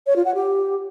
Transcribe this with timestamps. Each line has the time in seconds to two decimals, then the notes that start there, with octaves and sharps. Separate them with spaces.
0.07 C#5
0.16 F4
0.25 F#5
0.35 G4